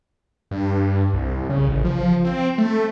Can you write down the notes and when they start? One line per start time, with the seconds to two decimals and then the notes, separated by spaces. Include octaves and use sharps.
0.51 G2
1.13 C2
1.49 C#3
1.69 A1
1.85 F3
2.24 C4
2.58 A3